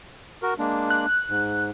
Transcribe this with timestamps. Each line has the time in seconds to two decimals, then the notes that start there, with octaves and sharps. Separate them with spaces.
0.42 F#4 A#4
0.58 G#3 A#3 D4
0.90 F#6
1.29 G#2